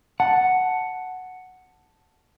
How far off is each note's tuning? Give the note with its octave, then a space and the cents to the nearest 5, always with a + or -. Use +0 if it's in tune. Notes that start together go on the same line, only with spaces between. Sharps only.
F#5 +0 A5 +0